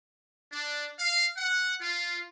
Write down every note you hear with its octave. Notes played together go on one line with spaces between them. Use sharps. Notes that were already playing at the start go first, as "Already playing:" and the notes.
D4
F5
F#5
F4